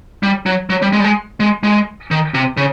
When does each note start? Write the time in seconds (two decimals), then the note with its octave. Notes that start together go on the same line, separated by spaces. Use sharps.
0.23 G3
0.46 F#3
0.70 F#3
0.82 G3
0.93 G#3
1.00 G3
1.04 G#3
1.40 G#3
1.63 G#3
2.11 D#3
2.34 C3
2.57 C#3